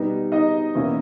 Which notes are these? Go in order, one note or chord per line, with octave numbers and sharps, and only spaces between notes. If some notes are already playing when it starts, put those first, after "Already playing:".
Already playing: B2 G3 B3 D#4
D#4 D#5
E2 B2 A#3 C#4 E4